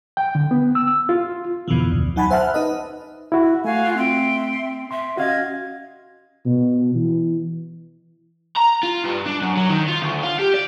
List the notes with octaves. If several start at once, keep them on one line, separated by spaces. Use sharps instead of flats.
G5
D3
B3
E6
F4
F2 B2 D3 E3 F3
D2
F#3 D#4 F#5 G#5 A5 B5
C5 E5 F#5 A5 F6 F#6
D#4 B4 D#5
E4 F#4
A3 F#4 F5 G#5
F4
C4 E5 G5 C6
E5 C6
C#4 F#4 D#5 F5 G#6
B2
E3
A#5
F4
G2
D4
F#2
F#3
D#3
F4
D2
F4
G4
D5